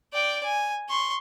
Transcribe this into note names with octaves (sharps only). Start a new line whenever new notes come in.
D5 G5
G#5
C6 C#6